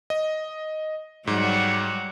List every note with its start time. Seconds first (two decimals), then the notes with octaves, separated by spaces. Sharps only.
0.10 D#5
1.27 G#2 F#3 G3 F#4